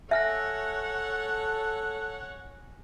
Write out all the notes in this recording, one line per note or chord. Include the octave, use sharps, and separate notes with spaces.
A4 C#5 E5 F#5 G#5 F6 A#6